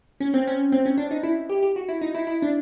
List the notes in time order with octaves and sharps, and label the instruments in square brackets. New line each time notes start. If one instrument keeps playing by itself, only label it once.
[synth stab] C#4
C4
C#4
C4
C#4
D4
D#4
E4
G4
G4
F#4
E4
D#4
E4
E4
D4